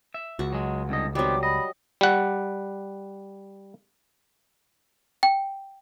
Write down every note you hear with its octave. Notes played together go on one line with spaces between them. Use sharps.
E5
C#2 F#4
F#3 G#3
C2 D3 D#5
D#3 F#3 G3 B3 C4 D6
D#5 B5
G3 F#5
G5